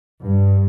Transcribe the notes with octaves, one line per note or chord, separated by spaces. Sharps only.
G2